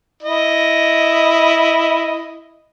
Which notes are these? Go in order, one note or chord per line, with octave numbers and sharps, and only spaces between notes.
E4 D#5